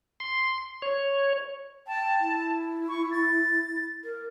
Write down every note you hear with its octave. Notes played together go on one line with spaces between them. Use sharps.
C6
C#5
G5 A5
E4
C#6
A6
A#4